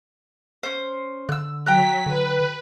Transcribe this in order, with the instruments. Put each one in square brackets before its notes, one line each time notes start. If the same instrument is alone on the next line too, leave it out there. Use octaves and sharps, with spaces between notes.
[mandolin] C#4 C5
[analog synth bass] D3 [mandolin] E6 F#6
[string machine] F#3 B6 [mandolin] G5 A#5 F#6
[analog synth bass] D3 [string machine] B4